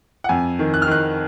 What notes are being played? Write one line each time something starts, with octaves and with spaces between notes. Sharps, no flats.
F#5
F2 G#5
D#3
F#6
F6
D#3 F#6